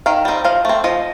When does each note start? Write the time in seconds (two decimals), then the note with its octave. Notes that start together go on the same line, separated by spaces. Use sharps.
0.06 D#3 F5
0.25 G3 C4 D#4
0.44 F3 F5
0.65 A3 C4
0.84 F3 D#5